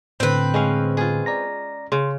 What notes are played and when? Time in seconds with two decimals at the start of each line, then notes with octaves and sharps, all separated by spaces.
0.20 A2 D3 C4 B4
0.54 G#3 C#4 F5
0.97 F4 G#4
1.26 D5 A#5 A#6
1.92 C#3 C6